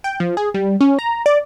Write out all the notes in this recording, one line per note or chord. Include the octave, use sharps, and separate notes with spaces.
G5
F3
G#4
G3
C#4
A#5
D5